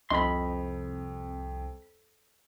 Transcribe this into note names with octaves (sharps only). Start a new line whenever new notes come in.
C2 F2 F3 D#5 B5 C6